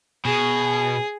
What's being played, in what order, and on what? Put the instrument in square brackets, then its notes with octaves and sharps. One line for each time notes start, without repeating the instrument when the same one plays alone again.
[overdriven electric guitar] B2 [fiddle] G#4